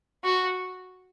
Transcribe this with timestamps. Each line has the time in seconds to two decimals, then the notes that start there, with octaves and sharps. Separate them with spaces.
0.24 F#4